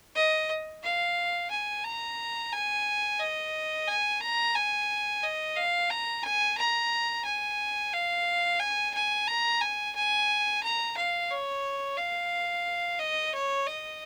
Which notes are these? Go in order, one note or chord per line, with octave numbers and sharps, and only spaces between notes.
D#5
F5
G#5
A#5
G#5
D#5
G#5
A#5
G#5
D#5
F5
A#5
G#5
A#5
G#5
F5
G#5
G#5
A#5
G#5
G#5
A#5
F5
C#5
F5
D#5
C#5
D#5